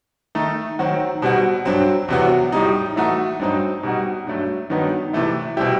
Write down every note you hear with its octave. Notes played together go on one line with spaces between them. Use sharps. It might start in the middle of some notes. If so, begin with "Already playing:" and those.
D#3 A3 D#4
D#3 F#3 C4 F#4
B2 G3 C4 F#4
G2 F#3 C4
E2 C3 F#3 B3 F#4
A2 G3 D#4
E3 A3 D#4 F#4
G2 F#3 C4 D#4
B2 G3 D#4 F#4
G2 F#3 A3
G2 D#3 F#3 B3 D#4
C3 E3 A3 E4
B2 G3 C4 E4 G4